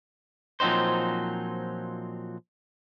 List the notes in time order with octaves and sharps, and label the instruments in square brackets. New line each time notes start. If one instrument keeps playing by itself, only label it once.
[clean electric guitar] A#2 F3 F#3 C4 D#4 C5